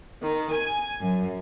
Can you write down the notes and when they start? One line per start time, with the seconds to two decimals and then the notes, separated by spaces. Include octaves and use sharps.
0.22 D#3
0.53 G#5
1.02 F#2